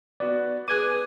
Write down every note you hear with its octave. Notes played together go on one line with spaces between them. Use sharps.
B3 F#4 D5
G#4 B4 D6 F#6 G#6 D#7